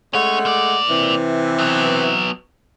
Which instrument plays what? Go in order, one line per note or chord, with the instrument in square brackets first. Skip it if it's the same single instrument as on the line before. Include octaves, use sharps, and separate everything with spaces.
[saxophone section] G#3 A3 F#5 [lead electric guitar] C#4 C#5
[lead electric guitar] A#3 D5
[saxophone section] C3 E3
[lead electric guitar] F#3 B3